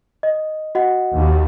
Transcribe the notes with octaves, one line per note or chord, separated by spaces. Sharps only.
D#5
F#4 D#5 F#5
D#2